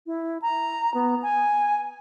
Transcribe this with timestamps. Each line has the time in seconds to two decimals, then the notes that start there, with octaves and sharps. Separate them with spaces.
0.06 E4
0.42 A#5
0.94 B3
1.23 G#5